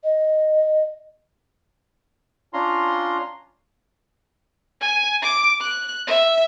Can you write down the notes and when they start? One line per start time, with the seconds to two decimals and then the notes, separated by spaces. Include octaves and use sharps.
0.04 D#5
2.53 C#4 D4 F4 A#5 C6
4.81 G#5
5.22 D6
5.61 F#6
6.07 E5